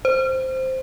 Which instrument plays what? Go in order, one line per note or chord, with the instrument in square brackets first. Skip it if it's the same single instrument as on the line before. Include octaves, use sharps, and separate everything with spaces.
[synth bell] C5